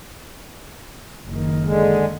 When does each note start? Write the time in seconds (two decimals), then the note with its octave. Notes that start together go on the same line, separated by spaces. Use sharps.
1.27 F#1 D#3
1.64 D3 G#3